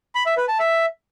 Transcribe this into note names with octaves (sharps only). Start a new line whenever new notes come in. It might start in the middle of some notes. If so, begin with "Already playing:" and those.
B5
E5
B4
A5
E5